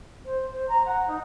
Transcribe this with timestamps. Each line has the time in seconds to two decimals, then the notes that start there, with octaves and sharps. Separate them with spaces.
0.25 C5
0.53 C5
0.68 A#5
0.85 F#5
1.07 D#4